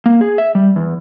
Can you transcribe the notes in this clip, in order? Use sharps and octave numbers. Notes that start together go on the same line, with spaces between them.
A#3
G#4
E5
G3
E2